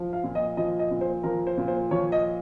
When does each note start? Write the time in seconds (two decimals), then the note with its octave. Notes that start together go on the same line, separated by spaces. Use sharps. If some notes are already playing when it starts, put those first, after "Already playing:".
Already playing: F3
0.13 F5
0.24 A#2
0.35 D#5
0.57 F3 D#5
0.79 D#5
0.91 A#2
1.01 C5
1.23 F3 A#4
1.47 C5
1.58 A#2
1.68 C5
1.91 F3 C#5
2.12 D#5